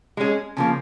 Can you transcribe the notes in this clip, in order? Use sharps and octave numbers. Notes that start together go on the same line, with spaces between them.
G#3 C#4 G#4
C#3 F3 A#3